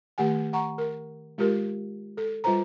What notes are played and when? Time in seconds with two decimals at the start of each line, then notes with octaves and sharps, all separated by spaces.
0.18 D#3 A3 G4 F#5 G#5
0.53 F#5 A#5 C#6
0.78 A#4
1.38 G#3 F4 G4 A#4
2.17 A4
2.44 G3 F4 B4 C5 A#5